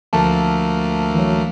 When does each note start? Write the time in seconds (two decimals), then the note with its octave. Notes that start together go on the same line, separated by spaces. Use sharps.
0.13 D2 F3 A3 A#3 A5
1.14 E3 F#3